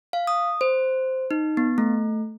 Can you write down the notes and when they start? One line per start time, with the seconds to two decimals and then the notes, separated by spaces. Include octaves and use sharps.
0.13 F5
0.27 D#6
0.61 C5
1.31 D#4
1.57 B3
1.78 A3